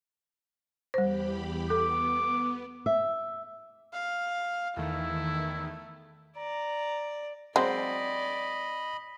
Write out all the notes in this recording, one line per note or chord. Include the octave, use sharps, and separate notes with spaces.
E2 G3 G4 C5 B5
B3 A4 D6
E5
F5
E2 D#3 A3 E4
D5 A#5
F#3 G#3 C4 C5 D5 D#5 B5